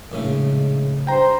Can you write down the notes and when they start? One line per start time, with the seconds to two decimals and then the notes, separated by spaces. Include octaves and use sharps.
0.12 A#1 A2 C#3 G#3
1.07 G2 C5 G5 A#5